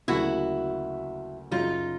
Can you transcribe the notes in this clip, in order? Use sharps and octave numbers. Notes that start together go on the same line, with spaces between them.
D2 C#3 F#3 A#3 E4 F#4
F#2 C#3 F#3 D#4 F4